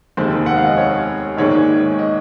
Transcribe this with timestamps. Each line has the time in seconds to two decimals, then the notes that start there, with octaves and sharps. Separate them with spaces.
0.17 F1 D#2 D#3 G#3 C5
0.46 F#5
0.57 F5
0.66 D#5
0.77 C#5
1.37 A#1 G#2 D#3 G#3 C#5
1.99 D#5